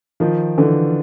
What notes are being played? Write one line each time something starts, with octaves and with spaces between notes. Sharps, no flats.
D#3 F3
D3 E3